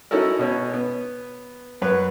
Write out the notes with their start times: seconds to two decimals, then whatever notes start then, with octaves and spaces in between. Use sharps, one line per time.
0.11 C#4 D#4 E4 F#4 A4 A#4
0.39 B2 C#4 C#5
0.74 B3
1.82 F#2 B4 C#5